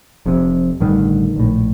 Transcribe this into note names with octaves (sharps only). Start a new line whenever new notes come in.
F1 F2 C3
A1 G2 D3 D#3
A#1 A2